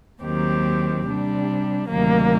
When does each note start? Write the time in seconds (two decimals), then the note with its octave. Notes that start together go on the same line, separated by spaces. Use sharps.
0.23 D#2 D#3 F#3 C4 G4
1.06 C3 G3 D4
1.88 D2 C3 D#3 F#3 A#3